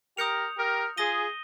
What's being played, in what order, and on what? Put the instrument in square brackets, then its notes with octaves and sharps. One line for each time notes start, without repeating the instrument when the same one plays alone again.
[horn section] G4 A#4 [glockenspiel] D#6 G6 C#7 F7
[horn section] G4 A#4
[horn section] F4 G#4 [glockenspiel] D#6 A#6 D#7 G7